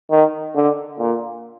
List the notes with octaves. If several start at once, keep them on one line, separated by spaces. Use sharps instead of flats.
D#3
D3
A#2